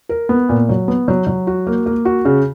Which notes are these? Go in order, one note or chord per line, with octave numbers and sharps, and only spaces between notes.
A#4
B3
A#2
F#3
B3
F#3
F#3
F#4
A#3
A#3
F#4
C#3